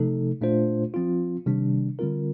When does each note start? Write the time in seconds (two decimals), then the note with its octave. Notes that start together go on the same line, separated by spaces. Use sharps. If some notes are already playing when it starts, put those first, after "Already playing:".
Already playing: C3 F3 A3 D#4 A4
0.41 A#2 A3 D4 F4 C5
0.94 F3 C4 F4
1.46 C3 D#3 G3 D4
1.99 D3 G3 C4 F4 A#4